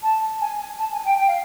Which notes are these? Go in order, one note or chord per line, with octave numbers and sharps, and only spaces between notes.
A5
G#5
G#5
A5
G#5
G5
G5
F5